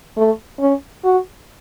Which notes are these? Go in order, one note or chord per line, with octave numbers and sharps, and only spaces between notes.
A3
C#4
F#4